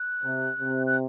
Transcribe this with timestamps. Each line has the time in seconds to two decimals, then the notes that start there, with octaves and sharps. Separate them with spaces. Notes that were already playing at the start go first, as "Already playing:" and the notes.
Already playing: F#6
0.23 C3
0.60 C3
0.87 F#6